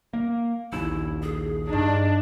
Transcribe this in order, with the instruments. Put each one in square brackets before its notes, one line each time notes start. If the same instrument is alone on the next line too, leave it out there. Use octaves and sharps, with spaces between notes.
[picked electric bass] A#3
[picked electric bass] A#1 D#2 [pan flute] E4 [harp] E6
[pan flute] G#4
[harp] G2 D#4 [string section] D4